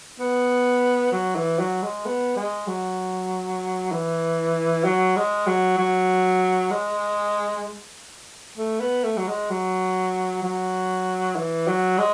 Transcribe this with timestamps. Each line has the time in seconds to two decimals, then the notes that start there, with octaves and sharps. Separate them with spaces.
0.19 B3
1.12 F#3
1.36 E3
1.59 F#3
1.82 G#3
2.05 B3
2.36 G#3
2.67 F#3
3.92 E3
4.84 F#3
5.16 G#3
5.46 F#3
5.78 F#3
6.71 G#3
8.57 A3
8.80 B3
9.04 A3
9.17 F#3
9.27 G#3
9.50 F#3
10.43 F#3
11.36 E3
11.67 F#3
11.98 G#3